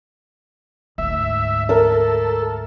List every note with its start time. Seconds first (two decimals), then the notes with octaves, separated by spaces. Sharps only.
0.98 D2 G#2 E5
1.69 A4 A#4 E5